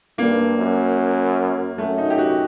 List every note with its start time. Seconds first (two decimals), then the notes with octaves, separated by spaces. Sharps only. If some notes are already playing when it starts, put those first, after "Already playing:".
0.18 G2 A#3
0.58 F#2
1.78 F#2 A3
1.98 D#4
2.10 G4
2.18 F#4